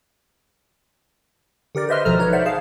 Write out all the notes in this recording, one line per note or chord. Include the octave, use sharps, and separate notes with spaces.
D3 G4 A#4 D5
B4 C5 D#5 E5 C6 F6
G#1 B2 F3 A4 A#5 F6
D#4 B4 C#5
C5 D5 E5 F#5
G#4 F5 A5